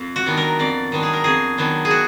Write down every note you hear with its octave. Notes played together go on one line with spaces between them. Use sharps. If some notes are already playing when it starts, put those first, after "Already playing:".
Already playing: F2
F#4
D#3 F#3 B3 D4
A#4
F2 D5
D#3 F#3 B3 D4
G#4
A#4
F2 G#4
D#3 F#3 B3 D4
G#4
F#4